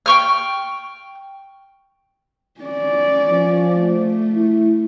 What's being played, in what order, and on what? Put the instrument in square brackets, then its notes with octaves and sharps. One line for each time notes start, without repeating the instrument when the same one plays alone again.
[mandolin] G5 C#6 F6
[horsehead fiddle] C#4 D5
[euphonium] F3
[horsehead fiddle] A3
[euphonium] E4